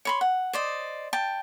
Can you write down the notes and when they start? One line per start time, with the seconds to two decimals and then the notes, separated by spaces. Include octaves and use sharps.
0.05 C#5 B5 C6
0.21 F#5
0.53 C5 D5 D#5
1.13 G5 A5